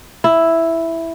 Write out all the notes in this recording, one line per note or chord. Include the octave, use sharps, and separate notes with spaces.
E4